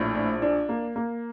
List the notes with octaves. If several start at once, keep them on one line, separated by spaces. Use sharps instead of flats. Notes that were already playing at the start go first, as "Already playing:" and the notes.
Already playing: A#1 A2
D4
D4
A#3
A#3